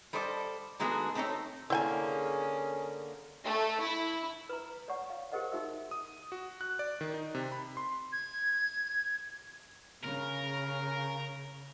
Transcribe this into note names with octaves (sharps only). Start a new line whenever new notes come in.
G3 A4 C5 D5 D#5
D#3 G#3 A3 B3 F#4 G#4
A3 C4 D#4 A4 C#5
D3 A#3 C#4 E4 G#4 G5 G#5
A3
E4
B4 A#5
C#5 D5 F#5 C#6
F5
G4 G#4 A#4 C5 D#5 F#5
D#4 F#4 G#4 E5 E6
D#6
F#4
F#6
D5
D#3
D#4
C3
B5
C6
G#6
C#3 A#4